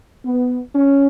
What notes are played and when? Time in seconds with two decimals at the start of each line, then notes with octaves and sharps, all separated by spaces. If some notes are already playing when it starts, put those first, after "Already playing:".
0.24 B3
0.75 C#4